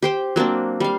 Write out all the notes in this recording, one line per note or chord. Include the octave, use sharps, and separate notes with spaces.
G4 C5 G5
F#3 A#3 C4 D4
G3 F5